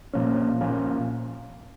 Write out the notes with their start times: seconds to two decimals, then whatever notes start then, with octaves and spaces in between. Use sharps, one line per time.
0.13 A#2 F3 A#3 C#4
0.61 A#2 F3 A#3 C#4